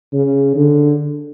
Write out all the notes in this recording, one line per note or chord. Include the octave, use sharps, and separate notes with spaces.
C#3
D3